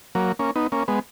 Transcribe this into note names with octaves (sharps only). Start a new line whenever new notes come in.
F#3 A#3
A#3 C#4
B3 D#4
A#3 C#4
G#3 B3